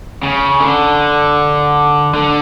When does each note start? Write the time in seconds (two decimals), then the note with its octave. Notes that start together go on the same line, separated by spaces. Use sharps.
0.23 C#3
0.60 D3
2.14 D3